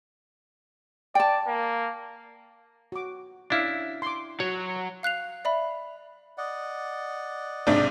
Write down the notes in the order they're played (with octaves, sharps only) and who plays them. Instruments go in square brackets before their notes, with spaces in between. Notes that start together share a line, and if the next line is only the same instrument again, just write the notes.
[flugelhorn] D5 [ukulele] G5 A5
[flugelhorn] A#3
[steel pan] F#4 D6
[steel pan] C#4 E5 F5 [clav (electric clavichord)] D4 E4
[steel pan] C6 D6
[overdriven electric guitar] F#3 [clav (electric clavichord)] C#5
[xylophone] F5 F#6 C7 F7
D5 E5 B5
[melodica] D5 D#5 F#5
[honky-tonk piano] B1 G#2 C3 [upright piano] D4